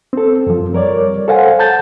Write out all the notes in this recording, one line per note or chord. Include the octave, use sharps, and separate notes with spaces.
C4 A4
F#2 F3
G3 A#4 C#5 D5
A4 C5 F5 F#5 G#5
A5 G6 A6